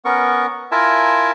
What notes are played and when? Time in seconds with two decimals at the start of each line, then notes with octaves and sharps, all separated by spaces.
0.05 B3 C#4 A#4 C#6
0.72 E4 F4 A#4 E5 G#5 A5